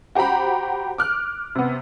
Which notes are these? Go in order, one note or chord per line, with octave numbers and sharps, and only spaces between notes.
F#4 G4 C5 A#5 B5
D6 F6 F#6
C3 B3